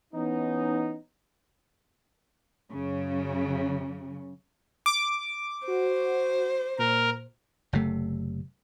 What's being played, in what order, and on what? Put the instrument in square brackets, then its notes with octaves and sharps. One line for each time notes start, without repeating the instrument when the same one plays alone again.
[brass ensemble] E3 B3 C#4 D#4
[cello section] F#2 C#3
[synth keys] D6
[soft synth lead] F#4 [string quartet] C5
[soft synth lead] A#2 [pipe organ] A#4
[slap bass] F#1 C3 A3